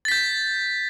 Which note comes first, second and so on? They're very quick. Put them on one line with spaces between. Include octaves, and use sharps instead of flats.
A6 B6 G6